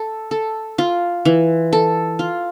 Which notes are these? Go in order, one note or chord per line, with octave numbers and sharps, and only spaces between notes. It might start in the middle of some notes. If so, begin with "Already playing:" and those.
Already playing: A4
A4
F4
E3
A4
F4